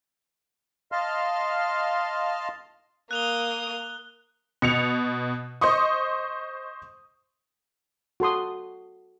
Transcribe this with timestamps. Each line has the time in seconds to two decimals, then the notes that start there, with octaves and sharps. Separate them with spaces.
0.92 D#5 F5 A5 C6 F6
3.11 A#3 D#6 F#6 F7 G7
4.62 B2 C#7 F7
5.61 C5 D#5 C6 C#6 D#6
8.20 F#4 A4 C6 D#6